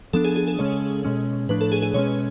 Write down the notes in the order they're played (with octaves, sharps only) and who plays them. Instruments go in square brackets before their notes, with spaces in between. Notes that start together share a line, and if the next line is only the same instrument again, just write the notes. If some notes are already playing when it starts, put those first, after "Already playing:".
[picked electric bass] F3 B3 D4 [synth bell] A4
[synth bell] G#4
G#4
A4
[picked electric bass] C#3 G#3 C#4 [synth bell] C#5
[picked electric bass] B2 G#3 C#4
[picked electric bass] A2 F3 A3 D4 [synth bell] B4
[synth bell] A4
G#4
G#4
[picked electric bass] B2 G#3 C#4 [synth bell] C#5